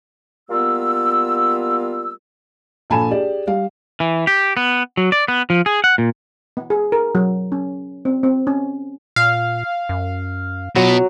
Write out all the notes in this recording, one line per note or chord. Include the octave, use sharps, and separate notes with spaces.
G3 A#3 B3 F4 E6
A#1 A4 G#5 A5 B5 E7
G4 G#4 D5
G3 F5
E3
G4
B3
F#3
D5
B3
F3
G#4
F#5
A#2
B3
G#4
A#4
F#3
C#4
C4
C4
C#4
A#2 F5
F#2
B2 F#3 F4